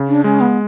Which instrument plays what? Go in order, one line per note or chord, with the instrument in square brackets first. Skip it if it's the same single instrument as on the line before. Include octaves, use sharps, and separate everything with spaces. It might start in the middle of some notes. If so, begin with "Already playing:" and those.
Already playing: [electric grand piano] C#3
[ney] D4
[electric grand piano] G#3 [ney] C#4
[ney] B3